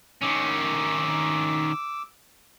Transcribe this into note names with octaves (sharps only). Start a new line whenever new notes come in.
D#3 C#4 D6 E6